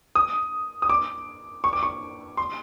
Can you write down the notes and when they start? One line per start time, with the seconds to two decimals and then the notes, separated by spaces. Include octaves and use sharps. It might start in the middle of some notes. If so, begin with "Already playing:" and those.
0.15 D#6
0.82 D#6
0.90 D6
1.64 C#6
1.73 D6
1.83 C#6
2.37 C6